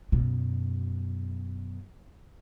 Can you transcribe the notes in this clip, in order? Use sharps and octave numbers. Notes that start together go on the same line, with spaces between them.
F#2 B2